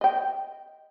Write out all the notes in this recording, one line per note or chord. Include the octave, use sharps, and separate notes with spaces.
D#5 G5